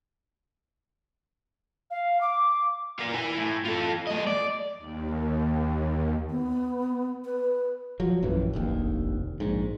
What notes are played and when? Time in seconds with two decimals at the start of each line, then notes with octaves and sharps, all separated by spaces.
1.91 F5
2.21 D6
2.99 F4 A#4
3.14 E4 G#5
3.38 A2
3.65 F4 A4
4.07 A3 D#5
4.27 D5
4.78 D#2
6.30 B3
7.25 B4
8.00 F3 F#3
8.23 A#1 F#2 A2 E3
8.53 F1 A#1 D#2
9.40 A#1 G#2